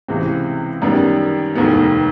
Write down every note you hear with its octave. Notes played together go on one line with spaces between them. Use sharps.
C#2 C3 E3 G#3 C4
F#2 D#3 G3 B3
F1 D#2 D#3 G#3 B3